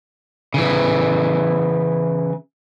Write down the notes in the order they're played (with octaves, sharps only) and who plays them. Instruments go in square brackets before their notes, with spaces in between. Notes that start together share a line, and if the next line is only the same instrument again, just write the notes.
[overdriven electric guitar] C#3 E3